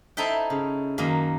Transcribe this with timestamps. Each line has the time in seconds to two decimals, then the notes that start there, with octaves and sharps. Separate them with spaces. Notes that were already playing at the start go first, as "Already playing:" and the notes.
0.17 D#4 E4 A4 C5 E5 G5
0.50 C#3
0.98 F#2 D#3 A#3